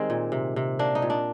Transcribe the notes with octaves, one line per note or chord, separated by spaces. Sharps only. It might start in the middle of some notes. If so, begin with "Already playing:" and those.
Already playing: D#3 G3 G#3 C4 D#4
A#2
C3
C3
A#3 D4
D#4
A#2
D4